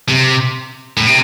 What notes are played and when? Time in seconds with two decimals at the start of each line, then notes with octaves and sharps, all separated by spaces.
0.09 C3
0.97 A2
1.06 C3